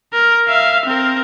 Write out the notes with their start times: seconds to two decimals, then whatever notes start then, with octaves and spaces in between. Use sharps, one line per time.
0.13 A#4
0.48 E5 F5
0.86 C4 A#4